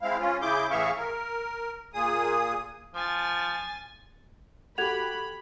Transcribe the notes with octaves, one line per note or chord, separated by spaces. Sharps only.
G#3 C4 E4 F5
C#4 F4
C#3 E4 G#4 D6 G6
A2 E3 G#4 E5 F5 C#6
A#4
A#2 G#4 D#6
F3 G#5 A6
F#4 G4 A4 B5 G#6 F7